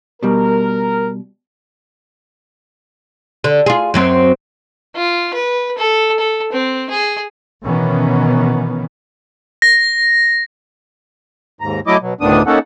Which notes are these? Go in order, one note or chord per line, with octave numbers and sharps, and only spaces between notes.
B2 G3 A#4
D3
F4 G#4
F#2 F#3 C4
F4
B4
A4
A4
C4
G#4
B2 D#3 E3 B3 C#4
A#6
D#2 G#2 A#5
F#3 A3 E4 D#5 D6
B2 F#3
D2 A2 D#3 B3 D4 D#6
A#3 C#4 D#4 A4 F#5